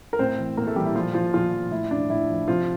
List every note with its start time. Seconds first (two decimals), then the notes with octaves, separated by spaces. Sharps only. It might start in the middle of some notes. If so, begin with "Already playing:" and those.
0.13 A#4
0.19 A2 C4 C5
0.38 E3
0.57 A2 A#3 A#4
0.67 A3 A4
0.76 E3 G3 G4
0.85 E4
0.95 A#2 F3 F4
1.14 F3 F4
1.33 A#2 F3 F4
1.53 F3
1.71 A2 E4
1.91 F3 D4
2.10 A2 E4
2.29 F3
2.48 C3 F3 F4